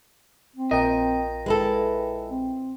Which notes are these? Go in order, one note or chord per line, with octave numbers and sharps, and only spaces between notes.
C4
A#1 A#2 A#4 D#5 G5
G#3 E4 A4 B4
C4